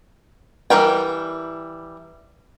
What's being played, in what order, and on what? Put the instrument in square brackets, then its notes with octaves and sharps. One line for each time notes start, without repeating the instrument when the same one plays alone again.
[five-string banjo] E3 G3 A#4 G5